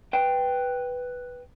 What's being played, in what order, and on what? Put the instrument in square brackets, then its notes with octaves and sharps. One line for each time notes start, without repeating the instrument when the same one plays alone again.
[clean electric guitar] B4 G5